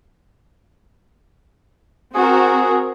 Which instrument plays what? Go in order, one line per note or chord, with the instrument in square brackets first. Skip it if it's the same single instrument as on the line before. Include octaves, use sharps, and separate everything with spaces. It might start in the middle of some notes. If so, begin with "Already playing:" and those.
[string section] C4 F#4 A#4 [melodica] G#4